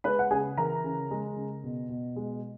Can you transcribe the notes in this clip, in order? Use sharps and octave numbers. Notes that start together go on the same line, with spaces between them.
G#3 B4 B5
F#5
C#3 G#4 G#5
E3 A#4 A#5
C#3
G#3
C#3
B2
B2
G#3